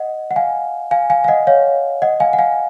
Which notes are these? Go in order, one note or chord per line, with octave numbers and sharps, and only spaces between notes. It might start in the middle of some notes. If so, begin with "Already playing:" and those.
Already playing: D#5 F#5
F#5
F5 G#5
F5 G#5
F5 G#5
F5
D#5 F#5
C#5 F5
D#5 F#5
F5 G#5
F#5
F5 G#5